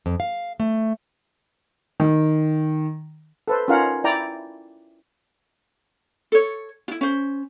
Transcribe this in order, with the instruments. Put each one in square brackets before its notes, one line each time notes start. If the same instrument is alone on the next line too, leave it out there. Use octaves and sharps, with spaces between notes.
[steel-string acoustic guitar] F2
F5
A3
[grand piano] D#3
[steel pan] A4 B4 C5
C#4 D#4 F4 A#4 F5 F#5
E4 D5 G5 A#5
[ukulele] A4 C#5
E4 F4
C#4 C5